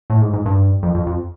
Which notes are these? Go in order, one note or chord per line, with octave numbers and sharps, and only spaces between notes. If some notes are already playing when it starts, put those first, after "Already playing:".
A2
G#2
G#2
G2
F2
F2
F2